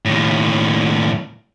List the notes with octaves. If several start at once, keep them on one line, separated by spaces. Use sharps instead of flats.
D#2 A2